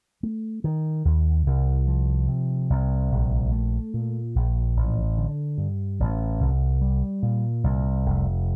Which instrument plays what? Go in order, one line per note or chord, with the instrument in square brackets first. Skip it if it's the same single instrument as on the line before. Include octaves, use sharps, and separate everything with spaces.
[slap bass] A3
D#3
D#2
C2
F3
C3
C2
A#1
A3
A#2
A#1
A1
D3
G2
A1
C2
G3
A#2
C2
F1